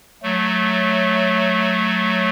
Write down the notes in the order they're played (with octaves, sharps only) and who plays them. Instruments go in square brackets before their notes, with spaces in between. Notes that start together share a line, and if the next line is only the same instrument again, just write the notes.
[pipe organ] F#3 A3